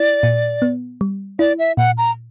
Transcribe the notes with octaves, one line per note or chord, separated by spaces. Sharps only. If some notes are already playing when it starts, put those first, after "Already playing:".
Already playing: E4 D5
A#2
B3
G3
E4 D5
E5
A#2 F#5
A#5